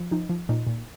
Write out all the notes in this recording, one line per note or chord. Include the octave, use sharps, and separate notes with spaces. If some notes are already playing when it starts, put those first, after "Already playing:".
Already playing: F3
F3 D#4
F3
A#2 D#4
A#2